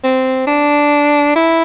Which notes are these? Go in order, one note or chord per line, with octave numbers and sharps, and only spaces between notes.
C4
D4
E4